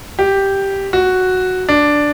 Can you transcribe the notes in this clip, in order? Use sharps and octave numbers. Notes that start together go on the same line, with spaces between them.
G4
F#4
D4